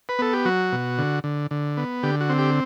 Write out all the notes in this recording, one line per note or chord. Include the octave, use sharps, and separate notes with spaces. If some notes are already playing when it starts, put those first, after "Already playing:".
B4
B3 A4
G4
F#3 F#4
B2
D3
D3
D3
B3
D3 G4
F#4
C4
G4